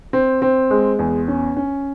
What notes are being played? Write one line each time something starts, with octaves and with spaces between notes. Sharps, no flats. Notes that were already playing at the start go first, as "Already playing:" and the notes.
C4
C4
G#3
E2
C#4
C#4